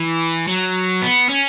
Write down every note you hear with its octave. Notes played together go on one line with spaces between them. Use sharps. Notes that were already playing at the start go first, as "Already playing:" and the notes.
Already playing: E3
F#3
B3
C#4